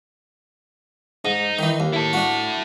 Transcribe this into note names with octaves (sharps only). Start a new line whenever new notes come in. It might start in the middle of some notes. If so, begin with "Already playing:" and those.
G#2 D#4
D#3 E3
D#2
E4 A4
D4 F#4